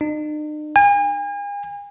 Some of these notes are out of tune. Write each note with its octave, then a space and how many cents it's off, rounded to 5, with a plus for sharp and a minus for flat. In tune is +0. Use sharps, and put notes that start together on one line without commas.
D#4 -45
G#5 -40